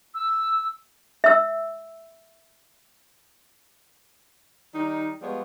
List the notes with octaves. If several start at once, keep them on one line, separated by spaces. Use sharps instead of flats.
E6
E5 E6
D#3 G3 D#4
F3 G3 G#3 B3 C#5